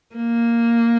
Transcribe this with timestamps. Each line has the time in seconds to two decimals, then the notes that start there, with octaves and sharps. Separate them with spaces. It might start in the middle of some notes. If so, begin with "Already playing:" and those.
0.16 A#3